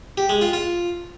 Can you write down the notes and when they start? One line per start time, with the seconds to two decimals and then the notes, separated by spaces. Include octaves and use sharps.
0.18 G4
0.29 G#3
0.41 F4
0.53 F4